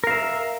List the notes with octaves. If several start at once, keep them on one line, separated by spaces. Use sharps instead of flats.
A#4 E5 F5